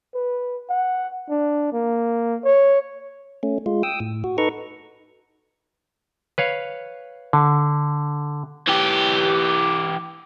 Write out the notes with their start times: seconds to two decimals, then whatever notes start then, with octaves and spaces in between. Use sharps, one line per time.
0.14 B4
0.69 F#5
1.30 D4
1.72 A#3
2.44 C#5
3.43 A3 C#4
3.66 G#3 F4
3.83 G5 D#6 E6
4.00 A2
4.24 F#4
4.38 D#4 A4 B4 A#5 C#6
6.38 B4 C#5 F5
7.33 D3
8.68 E3 G4